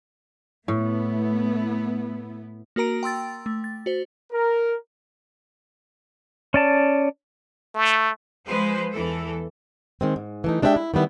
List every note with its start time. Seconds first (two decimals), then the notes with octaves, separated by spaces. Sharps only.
0.68 A2 A3 B3 E4
2.76 A#3 F#4 A#4 A#5 D7
3.03 G5 C6 E6 A6
3.46 A3
3.64 A6
3.86 F#4 C5
4.32 A#4
6.54 C#4 D5 A5
7.75 A3
8.46 F3 G#3 B4 C5
8.92 E2 E3 A4
10.01 D#3 G#3 C4
10.16 G#2
10.44 E3 A3 D#4
10.62 G#3 D4 G4 B4 E5 G5
10.76 E4
10.94 D#3 G3 B3 E4